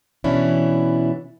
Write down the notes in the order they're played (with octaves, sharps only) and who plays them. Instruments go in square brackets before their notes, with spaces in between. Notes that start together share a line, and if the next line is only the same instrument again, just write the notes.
[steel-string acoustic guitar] B2 E3 C#4 D4 E4